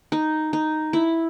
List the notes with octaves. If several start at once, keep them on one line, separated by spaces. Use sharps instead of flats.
D#4
D#4
E4